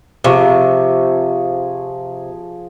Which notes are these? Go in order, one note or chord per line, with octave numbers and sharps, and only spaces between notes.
C3 F3 G#4 C#6